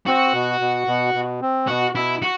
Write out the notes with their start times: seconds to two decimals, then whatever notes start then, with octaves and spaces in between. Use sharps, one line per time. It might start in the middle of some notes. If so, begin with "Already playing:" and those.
0.06 C4 F#4
0.33 B2
0.60 B2
0.87 B2
1.14 B2
1.41 C4
1.68 B2 F#4
1.95 B2 E4
2.22 F#4